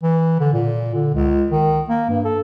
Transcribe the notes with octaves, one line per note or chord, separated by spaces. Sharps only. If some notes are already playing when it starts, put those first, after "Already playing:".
E3
D3
A#2
D3
C#2
D#3
A#3
G2
A4